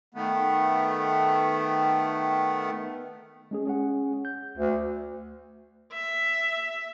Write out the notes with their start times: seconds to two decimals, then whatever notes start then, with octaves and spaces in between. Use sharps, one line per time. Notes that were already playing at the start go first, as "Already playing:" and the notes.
0.14 D#3 A3 B3
3.51 G#3 C#4 G#4
3.67 C#4 G#4 F#5
4.25 G6
4.57 D2
5.93 E5